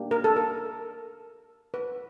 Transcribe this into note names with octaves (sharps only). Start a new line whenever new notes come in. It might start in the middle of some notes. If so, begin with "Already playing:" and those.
Already playing: A#3 D4 G4
A#4
A4
A#4
B4